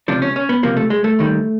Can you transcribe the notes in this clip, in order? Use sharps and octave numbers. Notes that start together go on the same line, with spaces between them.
C#2 C3 F3 D4
C#4
C#4
B3
C#2 C3 F3 A#3
A3
G#3
A3
D#2 D#3 G3